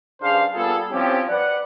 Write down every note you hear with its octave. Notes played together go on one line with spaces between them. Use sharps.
G2 C#3 D4 G#4 C5 F5
G3 A#3 B3 F4 G#4 A4
F3 G3 C4 C#4 E4 G4
B4 D5 F#5